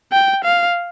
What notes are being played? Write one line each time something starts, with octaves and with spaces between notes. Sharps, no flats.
G5
F5